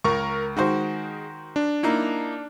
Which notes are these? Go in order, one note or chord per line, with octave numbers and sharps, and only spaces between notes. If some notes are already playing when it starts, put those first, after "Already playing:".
C#2 A#4 C#6
D#3 G#3 F#4 C5
D4
A#3 D#4 E4